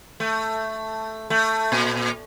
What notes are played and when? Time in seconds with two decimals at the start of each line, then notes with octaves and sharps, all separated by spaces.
0.20 A3
1.30 A3
1.72 A#2